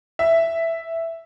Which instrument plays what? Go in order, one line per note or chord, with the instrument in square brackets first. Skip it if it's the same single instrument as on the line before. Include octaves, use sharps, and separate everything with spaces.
[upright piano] E5